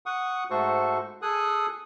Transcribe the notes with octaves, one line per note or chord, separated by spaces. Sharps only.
F#5 C#6 D#6
G#2 A3 F#4 A4 C5 C#6
G#4 A4 G#5 D#6 F#6